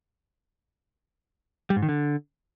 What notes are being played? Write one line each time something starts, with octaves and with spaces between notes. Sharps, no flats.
G3
G#2
D#3
D3